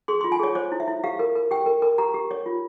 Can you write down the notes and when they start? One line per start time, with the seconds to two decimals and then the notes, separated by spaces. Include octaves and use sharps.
0.08 G#4 C6
0.21 C6
0.24 F4
0.32 G#5
0.39 G#4 C#5
0.55 C5 C#5
0.72 E4
0.80 E5
0.88 E4
1.04 G4 F5
1.19 A#4
1.35 A#4
1.51 G4 G5
1.66 A#4
1.82 A#4
1.98 G4 A#5
2.14 G4
2.31 C#5
2.46 F4